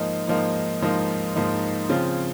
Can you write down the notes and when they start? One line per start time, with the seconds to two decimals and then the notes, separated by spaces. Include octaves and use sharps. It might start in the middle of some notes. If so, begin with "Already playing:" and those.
Already playing: G#2 F3 A#3 D#4
0.28 G#2 F3 A#3 D#4
0.82 G#2 F3 A#3 D#4
1.35 G#2 F3 A#3 D#4
1.89 C#3 F3 C4 F4